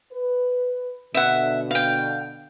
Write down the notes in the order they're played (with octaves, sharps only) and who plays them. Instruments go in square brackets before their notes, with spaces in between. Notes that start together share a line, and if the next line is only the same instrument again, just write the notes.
[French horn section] B4
[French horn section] B2 D3 [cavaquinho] E5 F#5
[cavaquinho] F5 G5